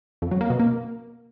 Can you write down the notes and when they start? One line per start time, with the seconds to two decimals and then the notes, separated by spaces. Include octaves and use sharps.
0.22 F2
0.31 F#3
0.41 A#3
0.50 B2
0.59 A#3